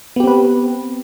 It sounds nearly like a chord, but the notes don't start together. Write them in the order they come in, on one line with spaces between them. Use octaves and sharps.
B3 G4 C4 B4